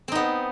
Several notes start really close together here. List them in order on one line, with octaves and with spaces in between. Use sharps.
C4 D#4 B3